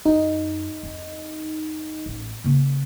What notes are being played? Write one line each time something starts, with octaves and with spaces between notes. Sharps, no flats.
F#2 D#4
F2
A1
C#3 A#3